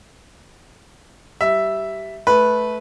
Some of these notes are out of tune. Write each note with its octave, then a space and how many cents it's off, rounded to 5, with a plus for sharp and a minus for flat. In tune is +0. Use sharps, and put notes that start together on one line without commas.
G3 -15 E5 +0
A3 -15 B4 -5